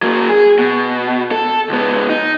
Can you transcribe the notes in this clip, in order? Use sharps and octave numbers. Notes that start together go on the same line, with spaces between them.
F#3 A#3
G#4
B2
A4
C#2 B3
D#4